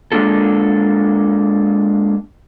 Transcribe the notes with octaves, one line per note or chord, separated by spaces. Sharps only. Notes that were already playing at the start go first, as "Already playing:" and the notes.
G#3 A#3 D4 F4 A4